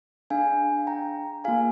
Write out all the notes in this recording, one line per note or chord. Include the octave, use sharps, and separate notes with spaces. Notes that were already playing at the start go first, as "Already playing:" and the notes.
D4 G#4 F5 G#5
G5 A#5
A#3 F4 G#4 F5 G#5